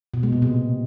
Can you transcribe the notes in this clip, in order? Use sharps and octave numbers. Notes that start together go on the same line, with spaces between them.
B2
G#3
A#2
C3